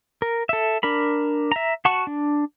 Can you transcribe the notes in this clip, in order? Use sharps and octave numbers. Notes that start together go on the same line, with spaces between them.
A#4
A4 E5
D4 A#4 B5
E5 A#5
F#4 F#5 A5 C#6
D4